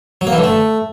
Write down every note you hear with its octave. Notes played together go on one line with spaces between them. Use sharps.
F#3
A#3
E3
D3
A3